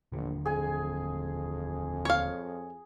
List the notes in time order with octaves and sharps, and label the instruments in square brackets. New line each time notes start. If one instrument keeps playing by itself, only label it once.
[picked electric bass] D#1 D3 [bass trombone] A#1
[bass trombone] F2 [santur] G#4 G#5
[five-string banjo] C#5 F5